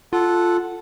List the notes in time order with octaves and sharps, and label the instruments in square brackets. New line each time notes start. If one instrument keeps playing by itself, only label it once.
[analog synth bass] F4 [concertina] A4 F#5